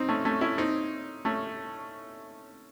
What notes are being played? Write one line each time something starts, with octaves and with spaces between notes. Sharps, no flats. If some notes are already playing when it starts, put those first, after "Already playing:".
Already playing: C4 D#4
A3 C#4
A3 C#4
C#4 E4
C4 D#4
A3 C#4